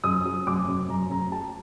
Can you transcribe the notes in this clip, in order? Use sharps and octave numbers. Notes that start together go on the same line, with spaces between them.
F#2 D#6
F#3
F#2 D6
F#2
F#2 A#5
F#2 A#5
F#3 A5